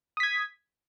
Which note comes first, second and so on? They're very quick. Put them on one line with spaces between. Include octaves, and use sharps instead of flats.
D#6 B6 G#6